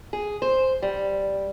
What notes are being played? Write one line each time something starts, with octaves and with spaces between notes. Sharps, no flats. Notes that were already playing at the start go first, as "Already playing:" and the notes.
G#4
C5
G3